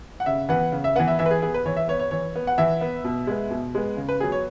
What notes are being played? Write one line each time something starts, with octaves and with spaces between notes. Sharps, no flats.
F#5
C#3 E5
E3 B3 F#5
C#3
E5
E3 B3 F#5
E5
E3 E5
B4
G#4
B3 G#4
B4
E3 C#5
E5
B3 C#5
C#5
E3 C#5
B3
F#5
E3 E5
B3
B2
G#3 B3
B2
G#3 B3
C#3
B4
F#3 B3 G#4
C#5